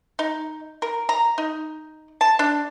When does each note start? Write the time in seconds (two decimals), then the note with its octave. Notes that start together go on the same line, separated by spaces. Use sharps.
0.19 D#4
0.82 A#4
1.09 A#5
1.38 D#4
2.21 A5
2.39 D4